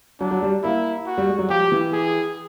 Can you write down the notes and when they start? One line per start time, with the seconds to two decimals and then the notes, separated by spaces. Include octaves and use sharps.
0.20 F#3 D4
0.31 F#3
0.43 G3
0.63 A#3 E4
1.07 F#4
1.18 G3
1.29 G#3
1.38 F#3
1.50 F3 G4
1.72 E3
1.93 G#4